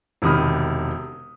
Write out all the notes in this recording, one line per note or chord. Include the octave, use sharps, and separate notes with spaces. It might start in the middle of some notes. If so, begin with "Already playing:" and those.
E1 C3 D#3 B5 D#6 F6